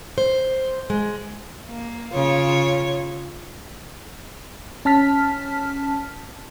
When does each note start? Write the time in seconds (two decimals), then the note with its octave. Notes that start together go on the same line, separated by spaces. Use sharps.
0.18 C5
0.90 G#3
1.67 A#3
2.12 C#3 F4 C#5
4.85 C#4 A5 F6 B6